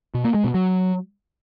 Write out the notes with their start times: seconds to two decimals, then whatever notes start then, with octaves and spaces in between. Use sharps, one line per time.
0.15 B2
0.24 A#3
0.34 G#3
0.44 B2
0.54 F#3